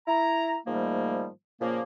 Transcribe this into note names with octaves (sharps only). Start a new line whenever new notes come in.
E4 A#5
G#2 D#3 F3 G3 A3 A#3
A#2 C#3 F3 A#3